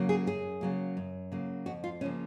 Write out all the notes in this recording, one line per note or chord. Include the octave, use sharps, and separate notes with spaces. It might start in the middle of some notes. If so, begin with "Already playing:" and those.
Already playing: C#3 F#3 A#3
G#4
F#2 G#4
C#3 F#3 A#3
F#2
C#3 F#3 A#3
F2 F#4
F4
C#3 F3 A#3 C#4